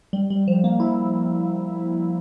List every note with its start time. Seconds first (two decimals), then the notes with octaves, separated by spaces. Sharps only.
0.13 G3
0.30 G3
0.48 F3
0.64 A#3
0.80 E4